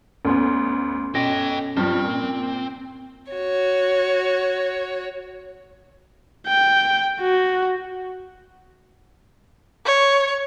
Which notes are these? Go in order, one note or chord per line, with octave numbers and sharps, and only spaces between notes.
D2 B3 C#4 C6
B2 C#4 A4 G5 A#6 D7
G2 F3 C4
A#2
F#4 C#5
G5
F#4
C#5